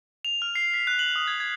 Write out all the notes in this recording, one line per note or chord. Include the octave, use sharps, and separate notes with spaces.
F7
F6
C7
B6
F#6
F#7
D#6
G#6
G#6